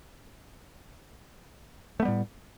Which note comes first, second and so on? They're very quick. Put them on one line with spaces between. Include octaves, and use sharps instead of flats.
A3 B3 G3 A2